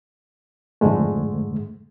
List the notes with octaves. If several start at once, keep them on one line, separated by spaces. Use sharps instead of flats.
F2 G#2 D3 G#3 A3